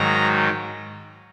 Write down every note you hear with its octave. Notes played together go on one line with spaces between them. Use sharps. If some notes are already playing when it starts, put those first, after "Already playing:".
Already playing: G#2 D#3 F#3 A#5